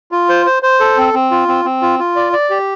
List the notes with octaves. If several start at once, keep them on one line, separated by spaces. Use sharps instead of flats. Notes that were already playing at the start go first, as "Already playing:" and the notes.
F4
C5
C5
C5
A4
C4
C4
F4
C4
C4
F4
F4
D5
D5
G4